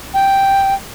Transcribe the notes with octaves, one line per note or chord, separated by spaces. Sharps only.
G5